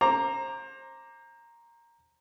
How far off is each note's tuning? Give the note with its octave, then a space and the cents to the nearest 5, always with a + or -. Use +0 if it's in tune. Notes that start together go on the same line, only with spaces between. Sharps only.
C5 +30 A#5 +0 D6 +0